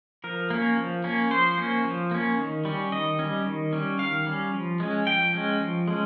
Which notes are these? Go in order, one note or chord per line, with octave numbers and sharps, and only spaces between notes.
F3 A#4
A#3 C#4
F3
A#3 C#4
F3 C5
A#3 C#4
F3
A#3 C#4
D#3
G3 C#4
D#3 D#5
G3 C#4
D#3
G3 C#4
D#3 F5
G3 C#4
F3
G#3 C#4
F3 G5
G#3 C#4
F3
G#3 C#4